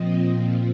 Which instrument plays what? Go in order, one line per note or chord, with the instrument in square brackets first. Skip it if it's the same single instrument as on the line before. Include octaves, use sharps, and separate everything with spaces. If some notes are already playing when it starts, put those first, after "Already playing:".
Already playing: [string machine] A#2 F3 C4 D#5